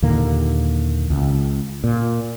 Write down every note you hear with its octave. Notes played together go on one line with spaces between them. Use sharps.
D#2 A#2 D3 A#3
C#2
A#2